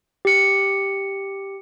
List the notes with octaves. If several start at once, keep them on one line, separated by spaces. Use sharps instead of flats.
G4 C#7